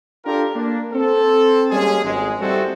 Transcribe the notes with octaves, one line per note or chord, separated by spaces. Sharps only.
D4 F4 G4 A4 A#4
A#3 D4
C4 A4
G3 G#3 A#3 C#4 G#4
G#1 F2 G#2 G#3
G3 A3 C4 E4 F#4 A4